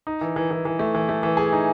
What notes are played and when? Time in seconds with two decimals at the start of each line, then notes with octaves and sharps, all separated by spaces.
0.07 D#4
0.21 E3
0.36 E3
0.51 E3
0.65 E3
0.79 A3
0.95 E3
1.09 A3
1.23 E3
1.37 G#4
1.53 D#4